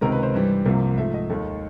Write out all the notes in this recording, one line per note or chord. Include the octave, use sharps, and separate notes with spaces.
C#2 C3 D#3 G#3 A#4
B4
C5
G2 E3 G3
C2 C3 F3 A#3
G#2 F3 A3 E5
D#5
D#2 D#3 G#3 A4